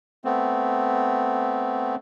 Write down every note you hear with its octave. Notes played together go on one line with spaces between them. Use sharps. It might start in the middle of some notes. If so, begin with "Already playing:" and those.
A3 B3 C4